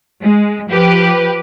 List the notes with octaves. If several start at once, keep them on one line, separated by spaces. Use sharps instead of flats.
G#3
F3 G4 B4